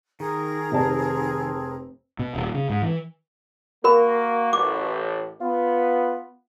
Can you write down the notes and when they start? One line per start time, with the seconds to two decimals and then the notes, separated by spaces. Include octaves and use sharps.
0.20 D#3 G#4 A#4 A#5
0.72 F1 C4 D5 A5
2.19 B2
2.35 D#1
2.54 C#3
2.70 G#2
2.82 E3
3.84 A#3 F#4 A#4 B5
4.53 A1 D6
5.41 B3 F4